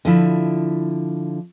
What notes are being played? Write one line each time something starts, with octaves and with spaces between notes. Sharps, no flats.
D3 F3 E4